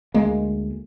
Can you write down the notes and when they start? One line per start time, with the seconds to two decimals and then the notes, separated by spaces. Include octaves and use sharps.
0.14 D2 G#3 A#3